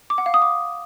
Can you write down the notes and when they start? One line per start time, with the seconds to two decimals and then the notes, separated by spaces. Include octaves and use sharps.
0.10 D6
0.18 F#5
0.26 F5
0.34 D#6
0.42 D6